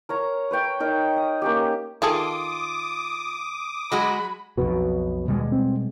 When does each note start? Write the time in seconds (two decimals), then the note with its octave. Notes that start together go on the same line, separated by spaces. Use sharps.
0.09 A#4 C#5 A#5
0.51 B4 C#5 G5
0.80 D#4 A#4
1.16 D#6
1.42 A#3 C#4 G4
2.02 D#3 F4 G#4 A4 D6 D#6
3.92 F#3 G#3 F#4 B5
4.58 B1 F2 B2 F#4 B4
5.28 D#2 B2 G3 G#3
5.52 C4